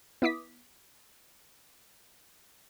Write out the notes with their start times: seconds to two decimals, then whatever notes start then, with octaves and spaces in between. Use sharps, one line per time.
0.22 B3 E4 D6 D#6 B6